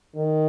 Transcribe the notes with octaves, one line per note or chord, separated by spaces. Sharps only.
D#3